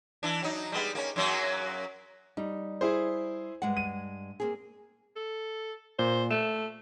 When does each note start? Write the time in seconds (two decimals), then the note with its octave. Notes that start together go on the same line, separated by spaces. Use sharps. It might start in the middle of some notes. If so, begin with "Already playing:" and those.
0.23 E3 D4
0.42 F#3 D#4
0.72 G3 G#3 B3
0.95 A#3 C#4
1.16 F#2 F#3 A#3
2.37 G3 D#4
2.81 E4 G#4 C5
3.62 G2 G#3 F#5
3.77 D#7
4.40 A#3 C4 G#4
5.16 A4
5.99 A#2 C5
6.31 A3 E7